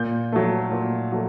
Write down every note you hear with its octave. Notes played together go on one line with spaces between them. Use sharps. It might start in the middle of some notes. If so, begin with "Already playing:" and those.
Already playing: A#2 G6
F#3 A3
A#2
F#3 A3